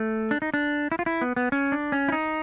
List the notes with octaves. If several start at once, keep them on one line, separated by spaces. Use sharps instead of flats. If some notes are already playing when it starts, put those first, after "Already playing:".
Already playing: A3
D4
D#4
D4
E4
F4
E4
B3
B3
C#4
D4
C#4
E4
D#4